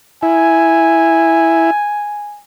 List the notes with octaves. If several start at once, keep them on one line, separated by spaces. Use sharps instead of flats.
E4 G#5